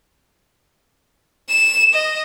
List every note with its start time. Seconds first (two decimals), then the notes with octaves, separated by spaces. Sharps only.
1.49 E7
1.93 D#5